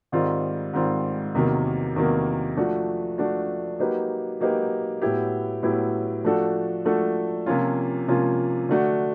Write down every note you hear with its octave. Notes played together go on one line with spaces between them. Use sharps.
G#2 D#3 G3 C4 F4
G#2 D#3 G3 C4 F4
E2 C3 D#3 F#3 A#3
E2 C3 D#3 F#3 A#3
F3 A3 D4 F#4
F3 A3 D4 F#4
F#3 A#3 D#4 G4 B4
F#3 A#3 D#4 G4 B4
A2 F#3 B3 E4 G4
A2 F#3 B3 E4 G4
F3 A3 D4 F#4 A4
F3 A3 D4 F#4 A4
C3 F3 A#3 C#4 F4
C3 F3 A#3 C#4 F4
D3 F#3 A3 D4 F#4